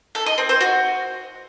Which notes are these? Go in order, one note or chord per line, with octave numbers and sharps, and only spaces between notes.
A4
D#5
C4
C5
F#4